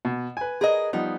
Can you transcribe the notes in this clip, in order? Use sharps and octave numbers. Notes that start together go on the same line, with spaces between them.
B2
B4 G#5
G#4 A#4 D#5
F3 G3 B3 D#4